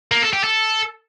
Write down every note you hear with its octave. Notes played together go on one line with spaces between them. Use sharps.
A#3
A4
G4
A4